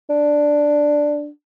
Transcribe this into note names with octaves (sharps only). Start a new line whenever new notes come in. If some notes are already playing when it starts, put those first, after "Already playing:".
D4